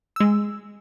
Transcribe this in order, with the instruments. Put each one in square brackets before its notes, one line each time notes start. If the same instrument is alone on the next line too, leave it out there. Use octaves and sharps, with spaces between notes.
[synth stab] G#3 E6